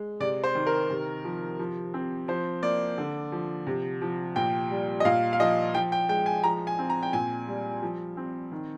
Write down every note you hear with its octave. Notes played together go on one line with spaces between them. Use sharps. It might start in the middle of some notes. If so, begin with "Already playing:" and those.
Already playing: G#3
C3 D5
C5
D#3
A#4
C3
F3
F3
C4
F3 C5
A#3 D5
D3
F3
C3
F3
A#2 G5
G3
D#5
A#2 F5
F5
F3 D#5
F3 G5
G5
G#3 G5
G#5
F3 A#5
G#5
C4
A#5
G5
A#2 G#5
G3
F3
C4
D#3